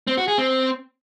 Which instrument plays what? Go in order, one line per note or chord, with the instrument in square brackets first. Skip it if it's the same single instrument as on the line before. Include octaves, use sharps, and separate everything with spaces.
[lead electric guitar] C4
F#4
G#4
C4